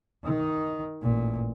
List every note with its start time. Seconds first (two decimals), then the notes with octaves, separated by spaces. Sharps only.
0.24 D#3 D#4
1.02 A1 A#2